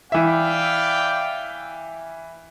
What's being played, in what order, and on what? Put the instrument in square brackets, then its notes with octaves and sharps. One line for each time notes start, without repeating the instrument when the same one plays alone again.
[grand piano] E3 E5 [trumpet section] D5 F5 G5